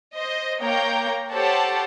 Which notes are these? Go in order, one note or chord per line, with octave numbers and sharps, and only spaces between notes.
C5 D#5
A#3 C#5 G5 A#5 G6
G4 A4 C5 C#5 F#5 A5